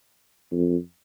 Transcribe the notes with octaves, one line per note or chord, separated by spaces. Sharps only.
F2